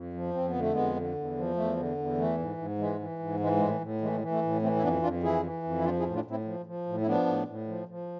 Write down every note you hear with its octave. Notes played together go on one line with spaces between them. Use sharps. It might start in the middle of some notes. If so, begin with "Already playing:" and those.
Already playing: F2
F3
F2 C4
B3
D3
A3
F2 G#3 B3
D3
E2
F3
E2 A3
D3
E2
E3 A3
G#2
G#2
E3 G#3
E3
G#2
E3 G#3
A2 G#3
A2
E3 G#3
A3
G#3
E3
A3
A2
E3 A3 C4
E4
F2 B3 D4
F2 D4 F4
E3 E4 G#4
E3
F2
E4
F3 D4 F4
E4 G#4
A2
D4 F4
A2
C4 E4
F3
F3
A2
E4
F3 B3 D4
A2
A2
F3
F3